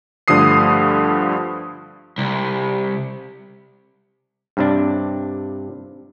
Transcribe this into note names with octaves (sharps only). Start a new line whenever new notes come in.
G2 D3 F3 A3 D#6 C7
C2
G2 C3 D4